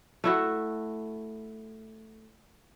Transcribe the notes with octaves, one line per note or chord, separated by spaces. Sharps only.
A3 E4 F#4